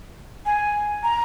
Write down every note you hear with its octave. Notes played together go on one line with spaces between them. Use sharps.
G#5
A#5